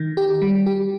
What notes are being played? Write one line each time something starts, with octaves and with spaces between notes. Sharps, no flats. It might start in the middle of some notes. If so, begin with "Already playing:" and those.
Already playing: D#3
G4
G3
G4